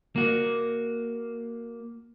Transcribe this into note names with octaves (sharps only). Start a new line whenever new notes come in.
A#3 F#4